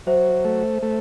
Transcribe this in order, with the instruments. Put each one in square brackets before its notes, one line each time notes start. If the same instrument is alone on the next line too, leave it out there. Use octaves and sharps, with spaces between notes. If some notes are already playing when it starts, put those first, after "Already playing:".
[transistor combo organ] F#3 [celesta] C5 E5
[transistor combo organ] A3
A3